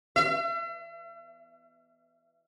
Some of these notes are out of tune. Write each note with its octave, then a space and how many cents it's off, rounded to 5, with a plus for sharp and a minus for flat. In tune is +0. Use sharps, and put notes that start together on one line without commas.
E5 +45